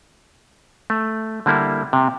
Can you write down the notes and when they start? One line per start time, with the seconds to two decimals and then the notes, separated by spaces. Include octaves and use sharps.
0.90 A3
1.46 D3 G3 A#3 E4
1.93 C3